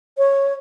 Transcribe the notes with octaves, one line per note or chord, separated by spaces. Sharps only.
C#5